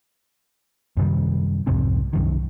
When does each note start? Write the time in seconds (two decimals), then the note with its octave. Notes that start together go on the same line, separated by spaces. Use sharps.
0.97 F#2 C3 D#3 G3
1.67 C2 F2 G#2 C3
2.13 C2 F#2 D#3